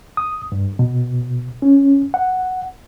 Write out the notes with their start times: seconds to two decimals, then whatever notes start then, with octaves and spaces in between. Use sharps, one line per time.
0.17 D#6
0.52 G2
0.79 B2
1.62 C#4
2.14 F#5